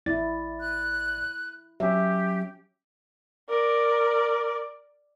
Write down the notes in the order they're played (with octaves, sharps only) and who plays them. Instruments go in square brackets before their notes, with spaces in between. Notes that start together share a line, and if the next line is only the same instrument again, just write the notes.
[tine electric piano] A1 D5 A6 [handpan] E4
[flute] F#6
[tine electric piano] F#3 C#4 [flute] G4 [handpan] E5
[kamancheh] A#4 D5